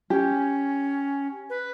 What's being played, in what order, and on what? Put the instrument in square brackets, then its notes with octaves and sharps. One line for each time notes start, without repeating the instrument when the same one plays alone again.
[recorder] C#4 [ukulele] G4
[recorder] B4